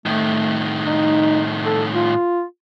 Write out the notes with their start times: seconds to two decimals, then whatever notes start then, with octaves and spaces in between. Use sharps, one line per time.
0.06 A2 D#3 A3
0.86 D#4
1.64 A4
1.95 F4